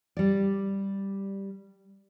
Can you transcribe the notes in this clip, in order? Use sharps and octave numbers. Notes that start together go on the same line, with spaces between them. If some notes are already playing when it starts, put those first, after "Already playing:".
G3 D5